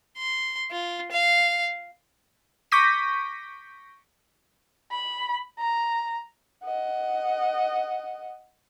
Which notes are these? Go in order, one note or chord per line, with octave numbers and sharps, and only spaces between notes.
C6
F4
F5
C#6 D6 G6 A#6 B6 D#7
B5
A#5
D#5 F#5